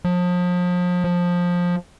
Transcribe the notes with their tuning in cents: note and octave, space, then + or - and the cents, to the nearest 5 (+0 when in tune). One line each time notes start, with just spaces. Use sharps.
F3 +35
F3 +15